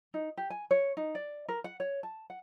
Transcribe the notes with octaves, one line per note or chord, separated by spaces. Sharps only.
D#4
G4
G#5
C#5
D#4
D5
A#4
F#5
C#5
A5
F#5